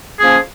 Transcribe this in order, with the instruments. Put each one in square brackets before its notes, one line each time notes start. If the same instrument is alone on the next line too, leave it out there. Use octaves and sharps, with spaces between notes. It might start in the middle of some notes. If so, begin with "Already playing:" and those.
[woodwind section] F3 A#3 C#4 G#4